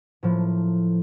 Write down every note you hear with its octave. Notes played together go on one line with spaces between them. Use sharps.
A2 F3 A#3